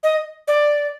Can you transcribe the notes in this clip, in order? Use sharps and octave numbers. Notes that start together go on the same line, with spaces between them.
D#5
D5